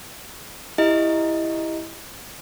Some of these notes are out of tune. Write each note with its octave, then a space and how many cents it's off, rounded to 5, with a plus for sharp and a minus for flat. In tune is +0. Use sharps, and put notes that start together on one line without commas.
E4 +0 G4 +15 D#5 +0